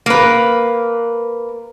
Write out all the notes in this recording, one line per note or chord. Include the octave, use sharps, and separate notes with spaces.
A#3 B4